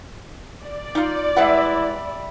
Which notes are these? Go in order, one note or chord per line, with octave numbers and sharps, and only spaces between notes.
D5
D#4 F4
G3 G#3 E4 B4 E5 F#5